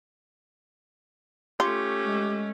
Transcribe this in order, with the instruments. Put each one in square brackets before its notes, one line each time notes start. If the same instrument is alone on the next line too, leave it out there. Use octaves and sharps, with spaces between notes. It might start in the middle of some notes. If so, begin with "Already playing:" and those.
[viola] A3 C#4 [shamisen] F4 [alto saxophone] G4
[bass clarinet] G#3